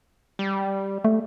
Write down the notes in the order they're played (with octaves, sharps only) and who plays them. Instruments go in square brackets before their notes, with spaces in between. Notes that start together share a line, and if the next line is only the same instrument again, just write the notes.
[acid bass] G3
[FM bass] A3